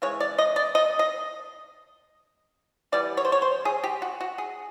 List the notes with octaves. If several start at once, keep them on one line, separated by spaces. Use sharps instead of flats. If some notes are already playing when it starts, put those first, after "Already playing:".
C#3 E3 G#3 C#5
D5
D#5
D5
D#5
D#5
E3 G3 B3 D5
C#5
C5
C#5
C5
G#4
G4
F#4
F#4
G#4